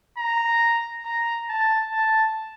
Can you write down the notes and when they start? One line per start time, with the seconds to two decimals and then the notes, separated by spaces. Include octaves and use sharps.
0.18 A#5
1.06 A#5
1.49 A5
1.92 A5